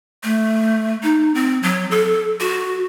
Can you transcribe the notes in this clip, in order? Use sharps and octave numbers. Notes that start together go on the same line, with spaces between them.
A3
D#4
C4
F#3
A4
F#4